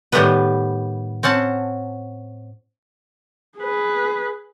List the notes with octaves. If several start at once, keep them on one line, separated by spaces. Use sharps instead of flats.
A2 D#3 G3 A3 B3 B4
C4 C#4 F#5 A5
G#4 B4